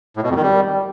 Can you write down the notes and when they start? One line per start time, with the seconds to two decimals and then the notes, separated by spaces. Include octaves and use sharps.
0.17 A2
0.23 B2
0.30 F2
0.36 D#3
0.43 G3